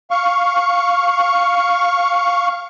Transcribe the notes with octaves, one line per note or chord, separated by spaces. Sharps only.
F5 C#6